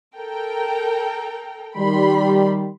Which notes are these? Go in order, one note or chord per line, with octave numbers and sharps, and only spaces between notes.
A4 A#4 G5
D#3 G3 B5 C6